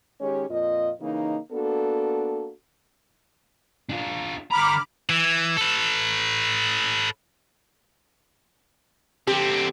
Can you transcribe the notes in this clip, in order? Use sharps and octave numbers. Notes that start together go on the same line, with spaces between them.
D#3 G#3 C#4 G4 C#5
F2 A#2 F3 F4 D#5
C#3 E3 A#3 D#4
A#3 B3 D4 F#4 A4
D4 F4
D3 A#5 B5 D6 F6
E3
A4 B4
D3 C4 G4